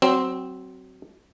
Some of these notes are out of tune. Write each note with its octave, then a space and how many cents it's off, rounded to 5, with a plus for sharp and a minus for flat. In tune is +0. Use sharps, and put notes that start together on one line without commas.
F#3 +20 C4 +0